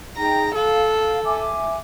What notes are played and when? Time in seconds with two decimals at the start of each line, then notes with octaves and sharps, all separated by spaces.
0.17 D#4 G#4 G5 A#5
0.55 A4 F5
1.25 E5 G#5 D6